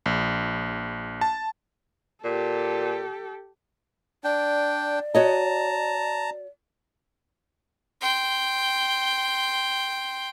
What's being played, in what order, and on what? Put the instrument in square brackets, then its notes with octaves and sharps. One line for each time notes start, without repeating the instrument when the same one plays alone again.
[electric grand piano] A#1
A5
[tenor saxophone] A#2 [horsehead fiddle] G4 A4
[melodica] D4 G5 [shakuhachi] D5
[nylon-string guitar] F#4 C#5 D#5 [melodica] A5 A#5
[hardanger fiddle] G5 C6